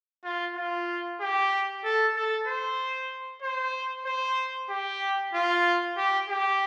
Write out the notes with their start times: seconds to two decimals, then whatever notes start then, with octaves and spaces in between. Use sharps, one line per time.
0.24 F4
0.56 F4
1.21 G4
1.84 A4
2.16 A4
2.47 C5
3.42 C5
4.06 C5
4.70 G4
5.34 F4
5.97 G4
6.29 G4